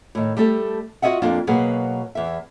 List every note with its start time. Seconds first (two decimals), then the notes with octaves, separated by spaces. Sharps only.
0.15 A2 D#3
0.37 G3 A3 G4 A4
1.02 F4 F#4 C#5 D#5 E5 F#5
1.22 F2 A#3 D4 F4
1.47 B2 F#3 A#3 G#4 B4
2.15 E2 E5